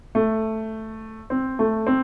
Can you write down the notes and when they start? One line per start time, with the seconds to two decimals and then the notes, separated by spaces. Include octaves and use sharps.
0.15 A3
1.30 C4
1.59 A3
1.87 C4